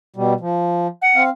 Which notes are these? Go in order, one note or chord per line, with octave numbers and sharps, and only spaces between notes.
B2 G3
F3
F#5
C4 F5